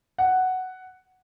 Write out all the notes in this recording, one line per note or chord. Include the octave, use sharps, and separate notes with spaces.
F#5